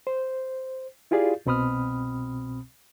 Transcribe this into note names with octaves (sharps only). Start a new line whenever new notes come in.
C5
E4 F4 G4 G#4 D5 F5
C2 B2 C4 B5 D#6 F6